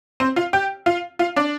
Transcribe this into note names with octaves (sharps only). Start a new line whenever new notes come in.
C4 C5
F4 F5
G4 G5
F4 F5
F4 F5
D4 D5